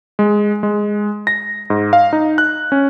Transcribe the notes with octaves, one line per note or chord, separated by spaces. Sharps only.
G#3
G#3
A#6
G#2
F5
D#4
F#6
C#4